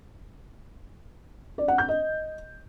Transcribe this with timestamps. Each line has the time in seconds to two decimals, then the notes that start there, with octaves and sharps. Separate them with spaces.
1.58 D5
1.68 F#5
1.78 G6
1.88 D#5